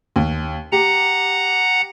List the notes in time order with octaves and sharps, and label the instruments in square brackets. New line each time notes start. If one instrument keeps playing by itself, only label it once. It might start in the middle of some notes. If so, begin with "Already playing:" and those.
[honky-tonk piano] D#2
[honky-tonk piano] G4 [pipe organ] F#5 A#5